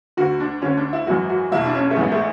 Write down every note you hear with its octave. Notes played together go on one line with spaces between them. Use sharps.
D2 D3 F#4
D4
D2 D3 C#4
D4
E4
G#1 F#2 E3 F#4
F#4
F#1 E2 B2 E4
D4
C#4
A3
A1 G#2 E3 B3
A3